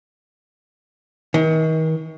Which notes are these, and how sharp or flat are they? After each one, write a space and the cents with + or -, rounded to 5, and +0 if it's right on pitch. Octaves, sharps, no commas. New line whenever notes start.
D#3 +40